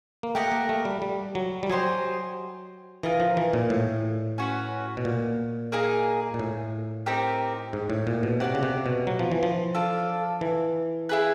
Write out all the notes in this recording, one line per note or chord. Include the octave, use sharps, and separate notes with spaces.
A#3
A3 G4 A#4 D#5 F#5
A#3
A3
G3
G3
F#3
G3
F#3 G4 C5 D#5 G#5
E3 F4 A#4 D#5
F3
E3
A#2
A2
C#4 F#4 B4
B2
A#2
A#3 D#4 G#4
A#2
A2
C4 D#4 G4 A#4
G#2
A2
A#2
B2
C3 F#4 B4 D5 F#5
C#3
C3
B2
F#3
F3
E3
F3
D4 F4 A4
E3
E4 G#4 B4